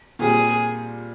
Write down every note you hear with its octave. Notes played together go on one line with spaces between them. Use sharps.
A#2 G3 C4 G#4